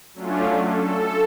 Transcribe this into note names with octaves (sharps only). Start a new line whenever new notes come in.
F#3 A3 C#4 D4 F4
A4